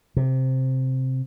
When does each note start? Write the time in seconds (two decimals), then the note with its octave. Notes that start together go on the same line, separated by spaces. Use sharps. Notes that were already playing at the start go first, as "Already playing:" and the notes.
0.17 C3